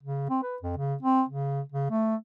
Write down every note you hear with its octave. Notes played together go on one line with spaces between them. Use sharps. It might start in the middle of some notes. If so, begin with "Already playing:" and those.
C#3
C4
B4
F2
C#3
C4
C#3
C#3
A3